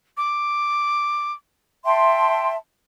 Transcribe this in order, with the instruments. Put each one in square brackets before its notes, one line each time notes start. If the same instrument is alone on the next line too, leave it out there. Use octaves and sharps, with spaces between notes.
[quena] D6
[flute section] E5 A5 C6 [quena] G5